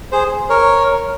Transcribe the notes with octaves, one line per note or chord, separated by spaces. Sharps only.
G#4 C5
A#4 C#5